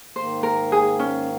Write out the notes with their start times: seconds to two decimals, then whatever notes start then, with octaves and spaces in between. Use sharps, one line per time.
0.16 G#2 D#3 A#3 C5
0.43 A#4
0.72 G#4
0.99 C#4